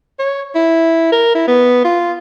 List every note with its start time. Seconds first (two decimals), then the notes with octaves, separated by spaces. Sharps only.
0.19 C#5
0.55 E4
1.12 A#4
1.35 E4
1.48 B3
1.84 F4